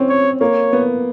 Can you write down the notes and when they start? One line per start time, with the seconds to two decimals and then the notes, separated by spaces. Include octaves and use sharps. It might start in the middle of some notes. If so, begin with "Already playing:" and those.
Already playing: C4 C#4
0.09 C#5
0.40 A#3 C#5
0.73 B3